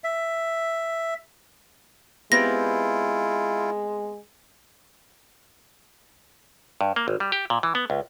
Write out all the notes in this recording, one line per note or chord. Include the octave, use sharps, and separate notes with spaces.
E5
G#3 B3 C4 E4 F4 G4 A#6
G2
A#3
G#1
G3
G4
A#2
E3
B3
C#2